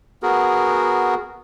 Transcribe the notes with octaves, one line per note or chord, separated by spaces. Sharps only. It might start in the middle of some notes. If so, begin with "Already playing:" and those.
B3 F#4 G#4 A#4